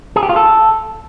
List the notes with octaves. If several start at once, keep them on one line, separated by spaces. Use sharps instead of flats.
G#4
G4
F4
A4